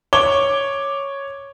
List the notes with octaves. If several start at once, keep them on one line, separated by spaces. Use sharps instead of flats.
C#5 D6 G7